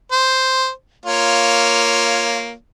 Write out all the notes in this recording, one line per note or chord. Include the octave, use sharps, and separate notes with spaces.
C5
A#3 F4 C#5